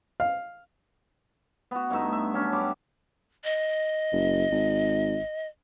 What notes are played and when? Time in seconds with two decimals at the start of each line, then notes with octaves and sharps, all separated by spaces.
0.20 F5
1.71 B3 F#4
1.90 G2 A3 D#4 E5
2.12 E5
2.34 F#3 C#4 D4
2.52 G2 G3 D6
3.44 D#5
4.12 F#1
4.52 G#1